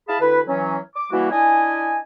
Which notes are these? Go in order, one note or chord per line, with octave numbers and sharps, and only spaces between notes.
E4 G#4 F5 A5 B5
D2 D3 E4 B4
E3 F#3 C#4
D6
E3 G3 A#3 E4 F#4
D4 E4 D#5 G#5